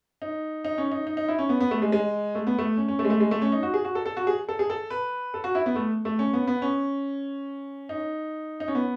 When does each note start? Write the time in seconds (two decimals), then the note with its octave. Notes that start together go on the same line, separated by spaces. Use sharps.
0.22 D#4
0.65 D#4
0.78 C#4
0.91 D#4
1.07 D#4
1.17 D#4
1.28 E4
1.38 C#4
1.49 B3
1.60 B3
1.71 A3
1.82 G#3
1.92 G#3
2.35 A3
2.47 B3
2.58 A3
2.77 C#4
2.88 C#4
2.99 A3
3.05 G#3
3.10 A3
3.20 G#3
3.31 A3
3.42 C#4
3.52 D#4
3.63 F#4
3.74 G#4
3.85 F#4
3.95 A4
4.06 A4
4.17 F#4
4.27 G#4
4.49 A4
4.59 G#4
4.70 A4
4.90 B4
5.34 A4
5.44 F#4
5.55 E4
5.66 B3
5.76 A3
6.05 A3
6.19 C#4
6.33 B3
6.47 B3
6.62 C#4
7.89 D#4
8.60 D#4
8.68 C#4
8.75 B3